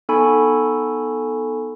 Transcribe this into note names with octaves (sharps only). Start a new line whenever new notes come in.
B3 D#4 A4 G#5 B5 C#6